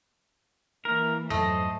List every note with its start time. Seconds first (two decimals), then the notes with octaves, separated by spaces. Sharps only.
0.85 E3 A#3 A#4
1.30 F2 G#2 F#3 A3 C5 D#5